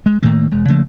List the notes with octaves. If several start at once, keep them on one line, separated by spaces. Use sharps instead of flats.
G#3
A2 D#3 A3 A#3
E1 G#3
C#3 F3 A3 A#3